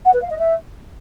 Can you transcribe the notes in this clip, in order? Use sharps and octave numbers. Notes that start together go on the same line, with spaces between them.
F#5
B4
F5
D#5
E5